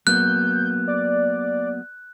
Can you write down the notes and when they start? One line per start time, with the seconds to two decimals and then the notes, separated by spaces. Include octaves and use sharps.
0.07 F#3 A#3 B3 F#6 G6
0.87 D5